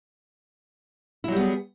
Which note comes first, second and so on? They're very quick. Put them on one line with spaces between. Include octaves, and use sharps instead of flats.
E4 F#3 G3 B3 G#4